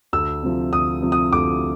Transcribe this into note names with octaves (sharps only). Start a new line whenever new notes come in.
D2 E6
C3 F3
D2 D#6
C3 F3
D#6
D2 D6